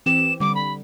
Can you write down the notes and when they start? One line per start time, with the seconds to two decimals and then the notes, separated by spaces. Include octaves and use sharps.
0.06 E3 C4 G4 E7
0.40 D3 G3 D6
0.55 B5